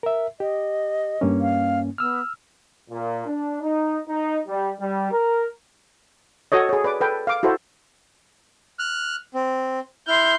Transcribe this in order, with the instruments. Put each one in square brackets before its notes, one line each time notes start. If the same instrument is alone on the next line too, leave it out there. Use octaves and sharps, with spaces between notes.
[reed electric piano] A#4 E5
[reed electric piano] G4 [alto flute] D#5
[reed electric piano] G2 A#3 C#4
[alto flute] F5
[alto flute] B3 [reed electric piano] E6 F6
[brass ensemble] A#2
D4
D#4
D#4
G3
G3
A#4
[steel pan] F#4 A4 C#5 D#5
G#4 C#5
B4 D5 D6
A4 B4 G5
F5 D6
E4 F#4 A4 C5
[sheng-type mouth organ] F6 F#6
C4
[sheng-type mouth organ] E4 F6 [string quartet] C6 G6